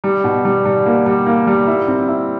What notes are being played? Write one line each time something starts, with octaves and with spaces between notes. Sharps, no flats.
G3
B2
G3
G3
A#3
G3
A#3
G3
E4
C4
E4